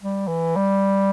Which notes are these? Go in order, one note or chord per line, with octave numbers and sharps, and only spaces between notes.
G3
E3
G3